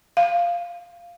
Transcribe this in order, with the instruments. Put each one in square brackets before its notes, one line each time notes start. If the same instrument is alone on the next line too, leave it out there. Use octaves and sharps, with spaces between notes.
[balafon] F5